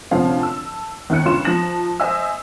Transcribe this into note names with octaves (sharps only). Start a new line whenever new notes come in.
D2 C3 F3 C4 C#4 F5
A5 E6
D#2 D#3 E4 F#6 C#7
G2 C#3 F4 C6 C#6 E7
F3 D#4 A5 A#6 E7 F#7
C5 D#5 E5 G#5 E6